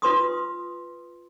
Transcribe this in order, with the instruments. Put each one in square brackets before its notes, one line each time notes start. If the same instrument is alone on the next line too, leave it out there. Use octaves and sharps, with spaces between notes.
[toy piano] F4 B4 C6 D#6